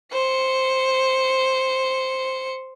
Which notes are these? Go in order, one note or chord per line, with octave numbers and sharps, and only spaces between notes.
C5 C#7